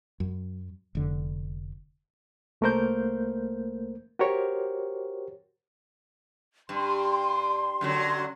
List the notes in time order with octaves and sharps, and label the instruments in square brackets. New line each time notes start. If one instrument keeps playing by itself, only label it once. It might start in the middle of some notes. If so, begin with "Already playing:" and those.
[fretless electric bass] F#2
F1 D3
[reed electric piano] C2 A3 A#3 A#4 C5 G6
F#4 G4 A#4 C5 C#5
[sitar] G2 [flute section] C6
[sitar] F#2 D3 F#3